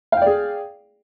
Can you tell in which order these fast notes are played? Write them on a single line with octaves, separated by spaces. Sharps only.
F5 G5 D5 G#4